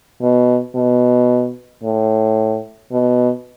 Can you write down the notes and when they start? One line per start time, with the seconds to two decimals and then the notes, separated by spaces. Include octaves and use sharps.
0.22 B2
0.75 B2
1.83 A2
2.92 B2